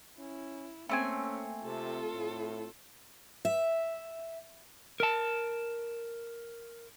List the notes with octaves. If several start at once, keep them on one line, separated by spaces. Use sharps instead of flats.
C#4 E4
A3 A#3 C4 C#4 G#5
C3 F4 A4
A2
E5
A#4 A5